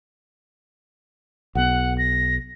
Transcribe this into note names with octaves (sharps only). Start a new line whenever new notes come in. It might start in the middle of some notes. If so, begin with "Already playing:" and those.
B1 B3 F#5
A#6